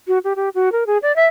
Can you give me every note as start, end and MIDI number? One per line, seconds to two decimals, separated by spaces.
0.07 0.18 66
0.24 0.33 67
0.36 0.49 67
0.55 0.72 66
0.72 0.86 70
0.86 0.98 68
1.02 1.14 74
1.16 1.26 76